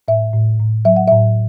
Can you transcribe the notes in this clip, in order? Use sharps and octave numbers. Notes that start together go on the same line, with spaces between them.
A2 E5
A2
A2
F#3 E5
F#5
A2 E5